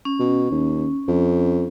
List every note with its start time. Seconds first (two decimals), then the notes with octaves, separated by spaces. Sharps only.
0.05 C#4
0.20 B2
0.51 D#2
1.08 F2